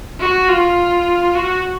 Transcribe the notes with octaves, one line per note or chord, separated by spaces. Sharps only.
F#4
F4
F#4